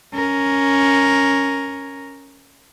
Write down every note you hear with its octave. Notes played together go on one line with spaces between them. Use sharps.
C#4 A#4